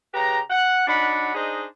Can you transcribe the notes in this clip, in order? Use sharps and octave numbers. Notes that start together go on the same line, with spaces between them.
C#3 G4 B4 A#5
F#5
F#3 D4 D#4 F#5 B5
D4 D#4 G#4 C5 D#5